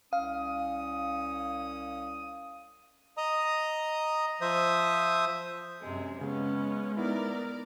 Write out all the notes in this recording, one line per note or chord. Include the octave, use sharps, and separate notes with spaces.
C2 C#4 F5 D#6
D#5 A#5 D#6
F3 C5 E5 D#6
F#2 C3 G#3
C#3 G#3 B3 C#4
B3 D#4 E4 A#4 D5